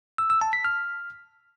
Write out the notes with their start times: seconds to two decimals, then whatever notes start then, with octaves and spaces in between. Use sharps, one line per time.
0.18 E6
0.30 E6
0.41 A5
0.53 B6
0.65 F6